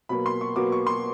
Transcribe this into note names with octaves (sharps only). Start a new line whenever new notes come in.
B2 F#3 A#3 B5
C6
C#6
B2 F#3 A#3 D6
C#6
C6